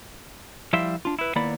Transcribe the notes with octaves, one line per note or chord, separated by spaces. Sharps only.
F3 G3 E4 E5 F5 C6
D4 F4
E4 B4
D#2 A#3 B3 E4 D5 B5